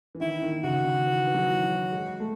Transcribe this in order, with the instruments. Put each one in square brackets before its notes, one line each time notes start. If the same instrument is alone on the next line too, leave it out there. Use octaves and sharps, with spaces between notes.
[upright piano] E3
[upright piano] D#3 [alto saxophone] E4
[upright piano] D#3
[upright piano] C#3 [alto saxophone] F#4
[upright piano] D#3
E3
E3
F#3
F#3
G#3
A3